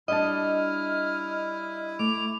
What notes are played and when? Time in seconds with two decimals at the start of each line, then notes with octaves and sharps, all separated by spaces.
0.08 G3 D4 E4 D#5 A5 F6
1.99 A3 D6 F7